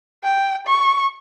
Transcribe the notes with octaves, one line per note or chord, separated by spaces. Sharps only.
G5
C#6